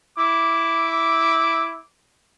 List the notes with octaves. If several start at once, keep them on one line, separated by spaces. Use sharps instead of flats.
E4 D6